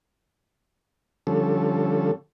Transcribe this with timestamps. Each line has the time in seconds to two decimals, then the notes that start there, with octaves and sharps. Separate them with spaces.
1.27 D3 F3 G3 C#4 A4